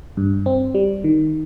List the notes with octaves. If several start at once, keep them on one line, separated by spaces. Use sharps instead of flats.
G2
C4
G3
D#3